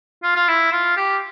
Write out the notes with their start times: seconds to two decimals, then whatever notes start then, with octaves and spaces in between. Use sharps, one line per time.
0.23 F4
0.36 F4
0.48 E4
0.72 F4
0.97 G4